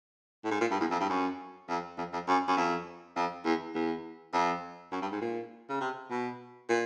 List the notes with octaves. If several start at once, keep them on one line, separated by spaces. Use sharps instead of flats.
A2
G#2
A#2
G2
E2
F2
G2
F#2
F2
F2
F2
F#2
F#2
F2
F2
E2
E2
F2
F#2
G2
G#2
A#2
C#3
C3
B2
A#2